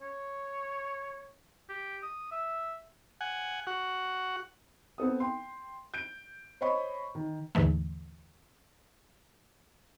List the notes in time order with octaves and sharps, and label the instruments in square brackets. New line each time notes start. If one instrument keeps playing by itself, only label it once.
[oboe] C#5
G4
D#6
E5
[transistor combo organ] F#5 G#5
F#4 F#5
[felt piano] B3 C4 A4 D#6
G5 C6
G6 D7
C5 C#5 D#5 B5 C#6
D#3
[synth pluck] D#2 G#2 D3 E3 A3